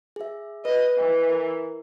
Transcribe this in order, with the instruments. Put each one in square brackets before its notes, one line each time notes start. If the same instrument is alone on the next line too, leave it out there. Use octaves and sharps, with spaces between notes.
[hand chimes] G#4 E5
[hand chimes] B4 [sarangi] D#5
[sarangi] E3
[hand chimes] A#4